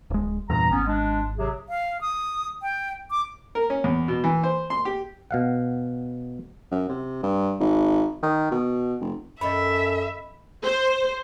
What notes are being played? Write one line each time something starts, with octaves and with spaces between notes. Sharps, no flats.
D1 G#3
E2 G2 A#2 A#5
G#1 B3 C#4
G#3 D4
C3 F#3 G#4
F5
D#6
G5
D6
A#4
C#4
E2
B2
E3
C5
C6
G4
B2 F5 F#5
F#2
C3
G2
G#1
D#3
B2
F1
F#2 D#3 A4 C#5 D#5 E5 B5
C5